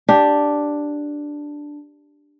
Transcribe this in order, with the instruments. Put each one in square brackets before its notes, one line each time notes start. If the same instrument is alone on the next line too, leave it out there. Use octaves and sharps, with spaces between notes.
[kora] D4 G4